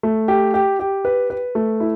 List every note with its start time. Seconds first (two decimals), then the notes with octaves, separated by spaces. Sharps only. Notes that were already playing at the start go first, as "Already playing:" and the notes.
0.03 A3
0.28 G4
0.54 G4
0.79 G4
1.05 B4
1.30 B4
1.55 A3
1.80 E4